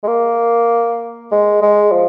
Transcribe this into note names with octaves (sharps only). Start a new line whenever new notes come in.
G#3
A#3
G#3
G#3
F3